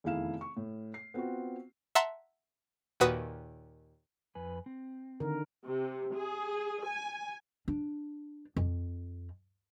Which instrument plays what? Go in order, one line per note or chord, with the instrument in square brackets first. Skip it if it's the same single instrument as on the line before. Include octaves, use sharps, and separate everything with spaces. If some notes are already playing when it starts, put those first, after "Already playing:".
[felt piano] F1 E2 D#3 E4 F5 E7
C#6
A2
C7
B3 C4 F4 F#4
[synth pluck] E5 F#5 A5 A#5 C6
D#2 A#2 F#4 B4 D#6
[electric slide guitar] F2 B4 G#5
C4
[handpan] D3 D#3 A#4
[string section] C3
G#4
G#5
[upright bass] D4
F2